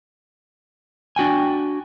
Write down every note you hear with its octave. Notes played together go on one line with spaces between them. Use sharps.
D4 F#4 G5 G#5